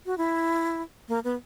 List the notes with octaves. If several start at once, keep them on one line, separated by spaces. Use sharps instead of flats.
F#4
E4
A#3
B3